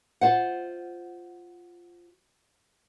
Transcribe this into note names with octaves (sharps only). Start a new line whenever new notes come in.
F4 C5 F#5